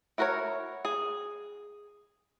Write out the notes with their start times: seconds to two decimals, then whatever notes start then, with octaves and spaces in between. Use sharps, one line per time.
0.18 E4 F#4 A#4 B4 C#5
0.85 G#4